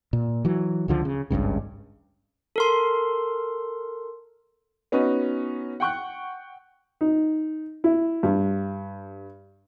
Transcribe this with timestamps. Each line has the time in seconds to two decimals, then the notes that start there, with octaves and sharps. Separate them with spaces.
0.13 A#2
0.45 E3 F#3
0.88 C#2 D3 F3
1.05 C#3
1.30 G#1 C#2 G2 C#3
2.56 A4 A#4 C6
4.92 B3 C#4 D#4 F#4 B4
5.80 F#5 G5 C#6 F#6
7.01 D#4
7.84 E4
8.23 G2